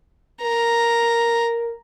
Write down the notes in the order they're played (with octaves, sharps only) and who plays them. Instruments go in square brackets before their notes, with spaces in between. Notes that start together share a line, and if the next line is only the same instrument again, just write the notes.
[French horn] A#4 [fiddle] A#5